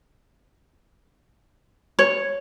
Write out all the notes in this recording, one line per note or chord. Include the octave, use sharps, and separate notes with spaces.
C#5